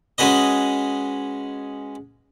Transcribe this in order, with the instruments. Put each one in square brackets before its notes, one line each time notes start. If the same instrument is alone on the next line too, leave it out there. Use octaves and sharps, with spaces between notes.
[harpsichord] G#3 C#4 F#4 G#4 B4 D#5